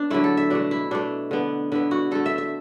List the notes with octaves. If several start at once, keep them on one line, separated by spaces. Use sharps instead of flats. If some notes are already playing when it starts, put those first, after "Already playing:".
Already playing: B3 D4
D3 F#3 A3 E4
A4
E5
B2 A3 D4
E4
B2 A3 D4
D3 B3
D3 B3 E4
F#4
D3 A3 A4
E5
E5